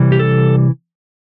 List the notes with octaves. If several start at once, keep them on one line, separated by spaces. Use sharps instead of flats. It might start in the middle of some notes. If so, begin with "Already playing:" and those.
Already playing: C3 E3 G3
G4
A4